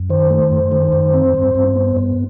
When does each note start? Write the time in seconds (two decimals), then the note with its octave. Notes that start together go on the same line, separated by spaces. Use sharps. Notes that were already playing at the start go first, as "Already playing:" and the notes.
Already playing: F#2
0.10 D#3 C5
0.30 A3
0.52 F#2
0.72 D#3
0.93 F#2
1.14 C4
1.34 G2
1.55 G2
1.76 B3
1.97 G2